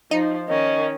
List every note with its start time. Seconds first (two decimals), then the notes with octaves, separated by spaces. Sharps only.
0.11 F3 D#4
0.48 D#3 C#4 D#5